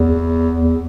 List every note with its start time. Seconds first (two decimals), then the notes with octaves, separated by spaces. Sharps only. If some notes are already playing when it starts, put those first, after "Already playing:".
Already playing: E2
0.60 E2